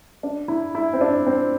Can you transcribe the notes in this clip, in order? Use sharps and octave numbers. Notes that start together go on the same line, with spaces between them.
D4
E4
E4
C4
D4
C4